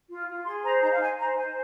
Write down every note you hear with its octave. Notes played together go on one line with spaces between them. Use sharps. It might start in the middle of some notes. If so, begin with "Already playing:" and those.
F4
F4
G#4 C6
C5 A#5
D#4 A#5
F5
D#4 G#5
C5 A#5
C5 G#5